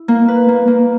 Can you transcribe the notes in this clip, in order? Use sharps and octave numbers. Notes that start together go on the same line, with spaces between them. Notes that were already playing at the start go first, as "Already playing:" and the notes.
Already playing: E4
A#3
B4
A#3
A#3